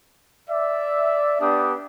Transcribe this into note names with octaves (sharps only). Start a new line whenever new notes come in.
D5 E5
B3 D4 G4 D#6